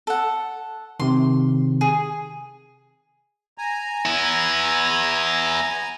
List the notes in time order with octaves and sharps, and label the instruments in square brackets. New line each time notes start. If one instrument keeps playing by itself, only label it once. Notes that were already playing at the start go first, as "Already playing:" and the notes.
[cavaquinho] A4 F#5
[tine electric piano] C3 D#3 [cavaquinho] C6
[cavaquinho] G#4
[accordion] G#5 A#5
[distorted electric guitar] B3 E4